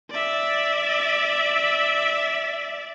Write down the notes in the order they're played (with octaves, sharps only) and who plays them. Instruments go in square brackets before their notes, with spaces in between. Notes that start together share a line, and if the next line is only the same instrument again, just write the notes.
[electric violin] D5 E5